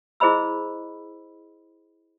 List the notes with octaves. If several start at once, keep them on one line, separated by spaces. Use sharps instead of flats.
E4 G#4 C5 D#5 B5 E6